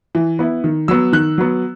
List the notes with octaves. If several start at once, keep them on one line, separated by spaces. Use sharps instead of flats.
E3
B3 E4
D#3
F#3 B3 E6
D#3 F#6
F#3 B3